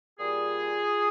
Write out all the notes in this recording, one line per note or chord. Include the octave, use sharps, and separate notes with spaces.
A#2 G3 F4 G#4